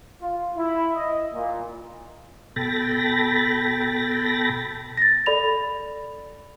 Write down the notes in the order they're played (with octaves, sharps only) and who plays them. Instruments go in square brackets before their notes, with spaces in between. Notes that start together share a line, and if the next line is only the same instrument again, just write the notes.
[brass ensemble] F4
E4
D#5
A#2
[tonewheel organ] B2 A4 G5 B5 A6 A#6
[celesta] A6 A#6
A4 D5 B5 F7